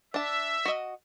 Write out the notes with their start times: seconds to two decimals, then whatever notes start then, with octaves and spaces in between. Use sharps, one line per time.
0.14 D4 E5 A5
0.65 F#4 D#5